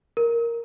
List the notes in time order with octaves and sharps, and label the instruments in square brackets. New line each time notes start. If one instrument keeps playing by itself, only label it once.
[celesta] A#4